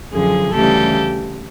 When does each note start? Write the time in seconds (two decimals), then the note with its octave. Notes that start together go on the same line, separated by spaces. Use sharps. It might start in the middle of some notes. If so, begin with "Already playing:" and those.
0.12 F#2 D3 F3 G#4
0.53 D2 C#3 E3 G3 G4 A4